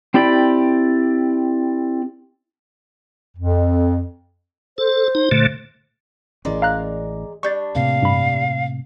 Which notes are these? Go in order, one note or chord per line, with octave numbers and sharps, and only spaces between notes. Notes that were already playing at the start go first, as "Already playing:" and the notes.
C4 E4 G4 D5 B5
F2
A4 C5
D#4
A#2 D3 A3
A1 E3 G#3 C#4 A#4 D5
F5 A#5 F#6
G3 D4 C#6 G6 A6
A2 C3 A#3 F5
G2 B5